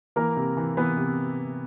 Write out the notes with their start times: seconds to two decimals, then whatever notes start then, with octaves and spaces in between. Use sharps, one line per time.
0.16 E3 A#3 A#4
0.37 C3
0.57 E3
0.77 E3 B3 B4
0.97 C3